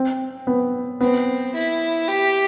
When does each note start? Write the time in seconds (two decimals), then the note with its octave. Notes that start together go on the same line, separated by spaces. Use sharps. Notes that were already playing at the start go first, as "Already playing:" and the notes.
Already playing: C4
0.47 B3
1.01 B3 C4
1.54 E4
2.08 G4